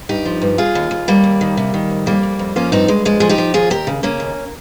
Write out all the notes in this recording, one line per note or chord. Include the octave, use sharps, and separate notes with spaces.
G2 D#4 G4
F3
G2
D#2 F4 G#4
D#2
D#2
D#2 G3 A#3
D#2
D#3
C3
D#3
F2
F2 G3 A#3
F2
F2
F3 A#3 C#4
G2 C4 D#4
G2 G#3
F3 G#3
F3 G#4
D#4 G4
F3
D#2 F4 G#4
D#2 G4 A#4
C#3
C#3 A#3 C#4
D#2